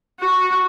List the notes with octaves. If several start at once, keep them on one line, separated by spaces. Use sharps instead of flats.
F#4